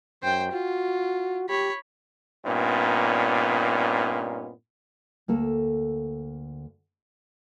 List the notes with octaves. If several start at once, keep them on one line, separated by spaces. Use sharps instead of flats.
F#2 C5 G5
F4 F#4
G4 C#5 B5
G2 A#2 B3 C#4 D#4
D2 A#3 A4